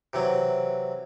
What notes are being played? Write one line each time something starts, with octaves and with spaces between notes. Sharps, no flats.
C3 E3 F#3